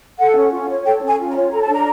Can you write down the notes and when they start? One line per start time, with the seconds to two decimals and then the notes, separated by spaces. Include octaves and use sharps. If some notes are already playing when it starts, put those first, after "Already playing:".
0.19 A4 F#5
0.36 C#4
0.52 F4
0.69 C#5
0.85 A4 G5
1.02 C#4
1.07 G#5
1.19 F4
1.30 A#5
1.35 C#5
1.52 A4 A#5
1.62 A5
1.68 D4 A#5